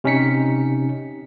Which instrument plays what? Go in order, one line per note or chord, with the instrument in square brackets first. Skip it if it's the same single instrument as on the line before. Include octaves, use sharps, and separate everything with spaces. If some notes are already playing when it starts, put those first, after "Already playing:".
[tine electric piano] C3 C#4 D#4 B6 C#7